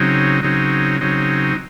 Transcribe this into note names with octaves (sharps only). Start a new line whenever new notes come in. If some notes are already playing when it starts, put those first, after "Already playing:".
Already playing: C#3 F#3 C4 D#4
C#3 F#3 C4 D#4
C#3 F#3 C4 D#4